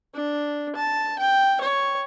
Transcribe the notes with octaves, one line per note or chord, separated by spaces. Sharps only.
D4
A5
G5
C#5